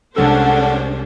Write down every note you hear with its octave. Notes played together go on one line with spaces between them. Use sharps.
C2 G#3 C#4 D4 A4 C5 F#5 E6